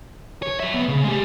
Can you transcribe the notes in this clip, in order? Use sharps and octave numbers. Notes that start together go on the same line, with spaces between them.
C#5
F#3 E5
D2 B3
C#3
G#3 G4